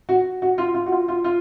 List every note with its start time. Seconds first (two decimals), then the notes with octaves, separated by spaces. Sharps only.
0.09 F#4
0.42 F#4
0.58 F4
0.74 F4
0.86 F#4
0.92 F4
1.08 F4
1.24 F4